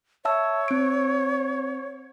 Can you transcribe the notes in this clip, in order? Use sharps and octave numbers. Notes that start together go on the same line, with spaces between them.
C#5 E5 A5 E6
C4 D7